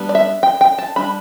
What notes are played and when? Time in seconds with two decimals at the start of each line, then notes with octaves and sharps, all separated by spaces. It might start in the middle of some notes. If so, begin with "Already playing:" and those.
Already playing: G3 B3 D4
0.09 D5
0.15 E5
0.43 G5
0.61 G5
0.78 A5
0.96 G3 D4 B5